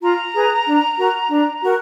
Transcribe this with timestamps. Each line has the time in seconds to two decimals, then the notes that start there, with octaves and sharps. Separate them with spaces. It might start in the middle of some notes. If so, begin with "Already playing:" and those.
0.01 F4 A#5
0.34 G#4 B4
0.66 D4
0.98 F#4 A#4
1.30 D4
1.63 F#4 A#4